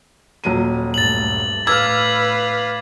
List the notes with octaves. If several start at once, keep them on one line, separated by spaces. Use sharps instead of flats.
D#1 F#3 D#7
G2 A3 A6 F#7
A2 B4 F5 D6 E6 F6 G#6